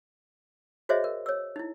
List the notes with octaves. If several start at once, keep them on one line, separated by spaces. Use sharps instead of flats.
F#4 G#4 C5 C#5 D#5 E5
A#4
C#5 E6
D#4 E4